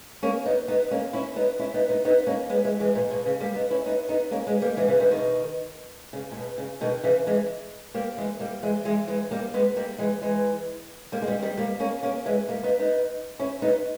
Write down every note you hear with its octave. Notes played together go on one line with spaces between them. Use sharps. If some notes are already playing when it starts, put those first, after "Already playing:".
A#3 C#4
B3 D#4
B3 D#4
A#3 C#4
C#4 E4
B3 D#4
C#4 E4
B3 D#4
B3 D#4
B3 D#4
A#3 C#4
G#3 B3
E3 G#3
E3 G#3
A#2
B2
C#3
G3 A#3
B3 D#4
C#4 E4
B3 D#4
B3 D#4
A#3 C#4
G#3 B3
G3 A#3
E3 G#3
C#3 E3
D#3 G3
B2 D#3
C#3
A#2
B2
C#3
B2 D#3
C#3 E3
E3 G#3
G3 A#3
E3 G#3
G3 A#3
E3 G#3
E3 G#3
E3 G#3
G3 A#3
G#3 B3
G3 A#3
E3 G#3
E3 G#3
G3 A#3
G#3
D#3 G3
D#3 G3
G3 A#3
A#3 C#4
A#3 C#4
E3 G#3
G3 A#3
B3 D#4
B3 D#4
C#4 E4
B3 D#4